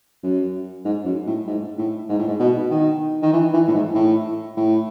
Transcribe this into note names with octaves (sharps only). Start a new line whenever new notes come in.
F#2
G#2
F#2
A2
G#2
A2
G#2
A2
G#2
B2
D#3
D#3
E3
E3
A2
G#2
A2
A2